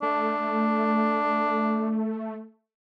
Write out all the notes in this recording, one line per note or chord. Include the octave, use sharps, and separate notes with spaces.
A3 D4